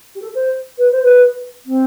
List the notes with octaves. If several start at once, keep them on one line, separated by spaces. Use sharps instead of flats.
G4
A4
C5
B4
C5
B4
C4